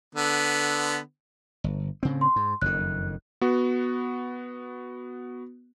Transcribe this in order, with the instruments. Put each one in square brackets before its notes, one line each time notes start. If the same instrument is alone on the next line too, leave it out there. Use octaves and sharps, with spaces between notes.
[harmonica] D3 B3
[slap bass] G1
A2 C#3 C4
[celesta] C6
[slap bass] G#2
[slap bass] F#1 F2 D#3 [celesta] F#6
[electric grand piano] B3 F#4